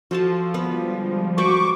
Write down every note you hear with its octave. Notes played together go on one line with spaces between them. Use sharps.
F3 F#4 A4 A5
D3 G3 G#3 B3 B4
F#4 B4 C5 C#6 D6